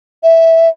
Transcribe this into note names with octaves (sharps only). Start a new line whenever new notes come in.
E5